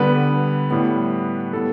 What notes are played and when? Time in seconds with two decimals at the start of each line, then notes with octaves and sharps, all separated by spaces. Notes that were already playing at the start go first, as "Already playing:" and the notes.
Already playing: D3 G3 B3 B4
0.71 A2 G3 B3
1.53 A2 G3 B3 A4